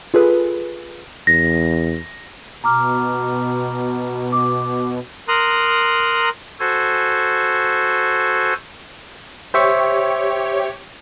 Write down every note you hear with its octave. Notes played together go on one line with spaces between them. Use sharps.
F4 G#4 A4 B4
E2 A#6
B2 A#5 D6 F6
D6
A#4 A#5 C6 D#6 F#6
F#4 A4 C5 G#5
G4 C5 C#5 E5 C#6